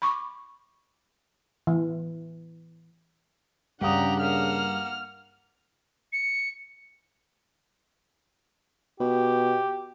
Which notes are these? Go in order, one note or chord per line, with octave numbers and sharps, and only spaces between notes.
B5 C#6 D6
E3
G2 C#3 D4 G4 F5 F#5 A#5 D#6
A#3 F#5 F6
C#7
B2 G4